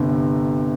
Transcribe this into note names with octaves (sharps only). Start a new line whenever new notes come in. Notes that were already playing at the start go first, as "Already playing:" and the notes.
Already playing: G1 C3